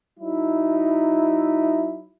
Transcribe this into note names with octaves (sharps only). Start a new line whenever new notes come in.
F#3 D#4 E4